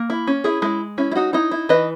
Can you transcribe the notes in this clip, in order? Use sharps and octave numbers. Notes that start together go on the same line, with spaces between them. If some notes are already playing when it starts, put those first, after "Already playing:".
Already playing: A#3
E4
C#4
E4 G#4
G#3 E4
C#4 E4
E4
D#4 F#4
D#4 E4
E4
E3 B4 D#5